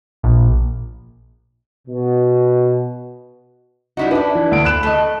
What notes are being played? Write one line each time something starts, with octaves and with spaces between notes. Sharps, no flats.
A#1
B2
G3 D#4 E4 F#4
D4 E4 B4
E3
D2 D7
B5 F#6 E7
A3 D#5